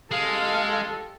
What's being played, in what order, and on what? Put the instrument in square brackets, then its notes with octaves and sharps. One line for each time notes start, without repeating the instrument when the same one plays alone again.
[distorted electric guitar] G#3 [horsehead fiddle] G4 A4 [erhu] F5